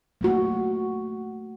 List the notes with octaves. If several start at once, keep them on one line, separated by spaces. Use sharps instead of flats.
A3 A#3 F#4